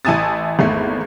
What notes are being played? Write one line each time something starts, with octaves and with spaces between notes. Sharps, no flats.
A1 E4 G#5 A5 D#6 A6
G#1 E2 A3